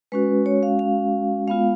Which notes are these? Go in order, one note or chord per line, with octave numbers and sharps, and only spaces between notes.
G#3 C#4 F#4 B4
C#5
F5
F5
G#3 B3 F4 F5